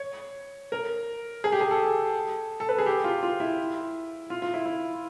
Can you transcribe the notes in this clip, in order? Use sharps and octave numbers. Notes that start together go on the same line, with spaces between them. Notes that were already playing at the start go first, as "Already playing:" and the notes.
Already playing: C#5
A#4
G#4
G4
G#4
A4
A4
B4
G#4
G4
F4
F4
E4
F4
F4
E4
E4